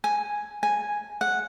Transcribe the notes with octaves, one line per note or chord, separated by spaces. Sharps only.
G#5
G#5
F#5